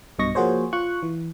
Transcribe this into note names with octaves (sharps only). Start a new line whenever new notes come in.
B1 G2 B2 D#5 C#6 A#6
F3 A#3 F#4 G#4 C5 C#5
F4 C#6 F#6
E3